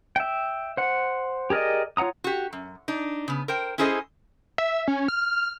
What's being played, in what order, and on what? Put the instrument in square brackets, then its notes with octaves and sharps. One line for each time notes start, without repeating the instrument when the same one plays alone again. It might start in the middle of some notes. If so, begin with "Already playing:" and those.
[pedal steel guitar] E5 G5
C5 F#5
G4 G#4 A#4 D5 D#5
F4 C#5 F#5 A#5 D#6
[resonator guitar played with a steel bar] F#4 G4
F#2
D4 D#4
C#3 B3
A#4 C5 G5
C#4 E4 G#4 A4 C5 D#5
[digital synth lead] E5
C#4
F6